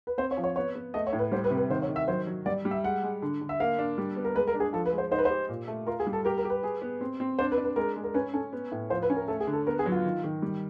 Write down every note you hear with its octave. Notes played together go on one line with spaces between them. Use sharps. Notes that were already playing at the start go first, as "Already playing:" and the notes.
B4
C4 C5
C#5
F3
C#5
B3 C#5
B3
A3 D#5
C#5
A2
B4
G3 C5
B4
C3
B4
D#3 C5
C#5
D#3
E5
F#3 C5
F#3
G3 D5
G3
E5
G#3 F#5
G#3
D3
D3
E5
A#3 F5
D4
G3
B3
A#4
G#3 B4
A#4
D4
G#4
F3 A4
B4
G#3
C5
D#4 C5
B4
G4 C5
A#2
A3
F4 A#4
G#4
G3
A4
G4 A#4
A#4
G4
B4
G#4
B3
C4
C4
D4 C5
B4
D4
B4
G#3 A#4
G#3
A#4
C#4 B4
C#4 A4
B3
A2
F3 C5
B4
C#4
A#4
A3 A4
G#4
D3
A4
B3 A#4
G#4
F#3
F4
D#3
D#3
G3